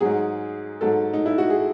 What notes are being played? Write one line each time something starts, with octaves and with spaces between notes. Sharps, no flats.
G#2 F#3 G#4
G#2 F#3 A4
D#4
E4
F#4
G#4